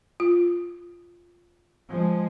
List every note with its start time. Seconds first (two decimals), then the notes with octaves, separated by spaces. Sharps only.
0.20 F4
1.89 F3 G#3